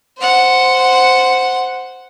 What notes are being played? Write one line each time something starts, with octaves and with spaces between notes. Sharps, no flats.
C5 F#5